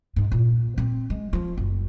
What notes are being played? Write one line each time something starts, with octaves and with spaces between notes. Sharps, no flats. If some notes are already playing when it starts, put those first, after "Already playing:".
G#2
A#2
C4
G#3
F3
F#1